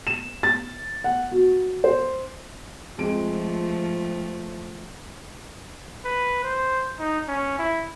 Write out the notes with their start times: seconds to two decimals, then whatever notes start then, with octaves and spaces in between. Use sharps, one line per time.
0.07 E7
0.43 A6
1.04 F#5
1.32 F#4
1.84 C5
2.98 F2 F3 G#3 A3 D7
6.05 B4
6.44 C5
6.99 D#4
7.28 C#4
7.59 E4